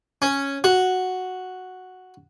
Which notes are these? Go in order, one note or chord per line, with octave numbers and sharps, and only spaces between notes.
C#4
F#4